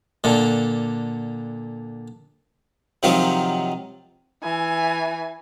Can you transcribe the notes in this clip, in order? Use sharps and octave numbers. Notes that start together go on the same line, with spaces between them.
A#2 D3
C3 D#3 F3 F#3 F4
E3 G#5